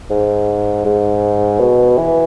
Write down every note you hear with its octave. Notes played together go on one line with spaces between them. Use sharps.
G#2
G#2
B2
E3